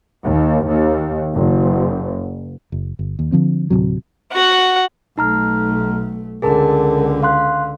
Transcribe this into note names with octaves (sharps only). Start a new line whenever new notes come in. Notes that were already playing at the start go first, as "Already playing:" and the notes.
D#2
D#2
F#1
F#1
G1
D#2
D3 F3 C4
D1 C2 C3 F#3
F#4 F#5
B1 A3 D#4 A#5 F6
C#2 D3 G#4 A#4 A5
F5 C6 F#6